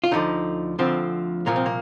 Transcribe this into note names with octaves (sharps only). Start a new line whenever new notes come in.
F4
D2 D3 F3 D#4
D2 D3 F3 C4
C2 A#2 F3 A#3
C4
A#3